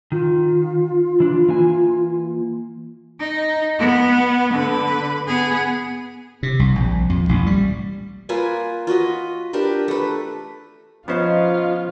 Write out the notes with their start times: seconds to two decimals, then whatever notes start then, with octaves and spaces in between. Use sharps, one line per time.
0.12 D#3 F4
1.20 E3 D4
1.48 E3 A#3 G#5
3.20 D#4
3.79 B3
4.54 D3 B4
5.27 B3 G#4
6.43 C3
6.59 C2
6.75 A#1
7.10 F2
7.29 A1
7.46 G3
8.29 A#3 F4 B4 G#5
8.87 F4 F#4 B4 D#5
9.53 D4 G4 A#4 B4
9.88 A3 B4
11.08 F3 B3 C#4 D#4 F4 C5 D#5 F5